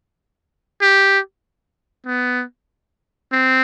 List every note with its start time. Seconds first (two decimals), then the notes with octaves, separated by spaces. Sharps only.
0.82 G4
2.06 B3
3.32 C4